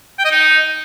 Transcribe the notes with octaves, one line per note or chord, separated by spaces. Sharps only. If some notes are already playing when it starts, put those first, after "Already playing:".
G5
D#5
D#4